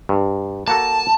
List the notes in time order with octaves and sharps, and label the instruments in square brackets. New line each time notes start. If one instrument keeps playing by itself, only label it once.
[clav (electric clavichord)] G2
[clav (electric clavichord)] A#3 F#4 A4 [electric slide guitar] A5